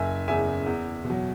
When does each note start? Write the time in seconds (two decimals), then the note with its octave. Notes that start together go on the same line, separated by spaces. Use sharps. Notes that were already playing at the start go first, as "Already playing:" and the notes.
Already playing: F#1 E5 G#5
0.28 E2 C#3 E5 G#5
0.66 E2
1.05 B2
1.10 F#3